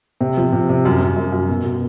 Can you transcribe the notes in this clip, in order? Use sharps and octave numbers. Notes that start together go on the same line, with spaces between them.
C3
F3
C3
C3
F#2
F#2
F#2
F#2
B2
B2